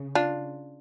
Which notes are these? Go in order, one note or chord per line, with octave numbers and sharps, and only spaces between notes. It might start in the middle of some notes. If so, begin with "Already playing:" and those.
Already playing: C#3
D4 F4